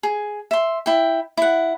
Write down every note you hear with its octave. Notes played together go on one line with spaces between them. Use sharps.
G#4
E5 C6
E4 G5
E4 F#5